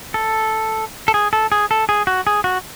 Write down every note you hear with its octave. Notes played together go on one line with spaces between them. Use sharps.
A4
A4
G#4
A4
G#4
A4
G#4
F#4
G#4
F#4